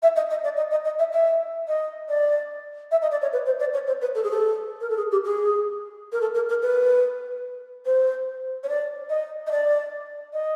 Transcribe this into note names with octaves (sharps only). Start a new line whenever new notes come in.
E5
D#5
D#5
D5
D#5
D#5
D#5
E5
E5
D#5
D5
E5
D#5
D5
C#5
B4
C5
D5
C#5
C5
B4
A4
G#4
A4
A#4
A4
G#4
G4
G#4
A#4
A4
A#4
A#4
B4
C5
C#5
D5
D#5
D#5
D5
D#5